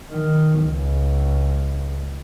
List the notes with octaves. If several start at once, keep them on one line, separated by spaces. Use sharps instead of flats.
D#3
C#2